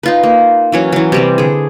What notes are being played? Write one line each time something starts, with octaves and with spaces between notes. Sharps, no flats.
D#4 F4 B4
A#3
E3 F#3 C#4
E3 F#3
C3 G3 C4
D3 G#4